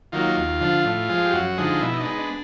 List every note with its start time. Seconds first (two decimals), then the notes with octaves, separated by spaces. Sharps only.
0.12 D#3 F#3 A#3 F4
0.37 D#2
0.61 D3 F3
0.85 A2
1.09 F3 G#3
1.25 G4
1.33 F#2 F#4
1.58 D3 F3 G#3 D#4
1.81 B2 E4
1.94 D#4
2.01 D4
2.05 G#3 B3 D#4
2.18 D4